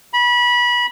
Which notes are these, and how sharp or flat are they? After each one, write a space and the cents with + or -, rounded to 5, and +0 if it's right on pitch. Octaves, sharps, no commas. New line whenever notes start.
B5 -25